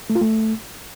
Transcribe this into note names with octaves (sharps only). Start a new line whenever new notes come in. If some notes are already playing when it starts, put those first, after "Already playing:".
A3
F4
A3